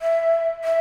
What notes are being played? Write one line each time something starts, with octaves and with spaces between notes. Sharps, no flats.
E5
E5